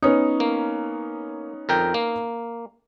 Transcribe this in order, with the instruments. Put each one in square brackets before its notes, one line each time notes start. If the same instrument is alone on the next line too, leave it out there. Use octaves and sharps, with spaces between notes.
[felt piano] B3 C#4 D#4
[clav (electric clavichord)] A#3
F2 A#4 G5
A#3